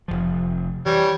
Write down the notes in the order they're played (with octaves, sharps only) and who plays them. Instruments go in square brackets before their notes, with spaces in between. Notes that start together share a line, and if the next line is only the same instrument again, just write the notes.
[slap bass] F1 A#1 F3
[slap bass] E3 [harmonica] G3 C#5